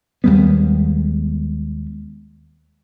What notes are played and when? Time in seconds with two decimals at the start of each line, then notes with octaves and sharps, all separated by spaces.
0.24 D#2 G3 G#3 B3